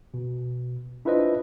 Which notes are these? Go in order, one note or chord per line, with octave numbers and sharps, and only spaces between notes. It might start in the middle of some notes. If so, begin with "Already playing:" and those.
B2
D4 E4 F4 B4 C5 D#5